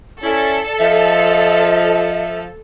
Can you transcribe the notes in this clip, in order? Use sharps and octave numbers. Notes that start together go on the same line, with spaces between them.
C#4 E4 A4 D5
F3 D#5 E5